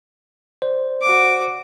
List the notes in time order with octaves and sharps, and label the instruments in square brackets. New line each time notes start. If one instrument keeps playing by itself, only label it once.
[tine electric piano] C5 D5
[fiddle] F#4 D6